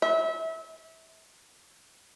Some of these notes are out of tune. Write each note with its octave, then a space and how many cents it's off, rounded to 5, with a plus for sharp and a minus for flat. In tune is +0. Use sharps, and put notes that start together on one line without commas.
E5 -30